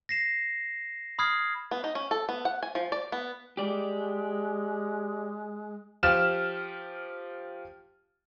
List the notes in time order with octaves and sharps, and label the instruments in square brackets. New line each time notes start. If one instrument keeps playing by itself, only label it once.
[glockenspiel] A#6 C7 E7
B5 D#6 F6 G#6 C7
[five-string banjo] B3
D#4
C#4
A4
B3
F#5
G#5
F3
D5
B3
[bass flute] G#3 [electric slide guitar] G4 D5
[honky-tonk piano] F3 G4 F6 E7